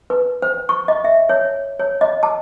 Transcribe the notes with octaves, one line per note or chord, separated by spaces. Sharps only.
B4
C5
C#6
D#5
E5
C#5
C#5
D#5
A5